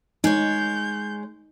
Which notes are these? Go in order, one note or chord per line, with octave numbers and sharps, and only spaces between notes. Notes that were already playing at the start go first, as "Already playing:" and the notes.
G#3 D#4 C#5 G6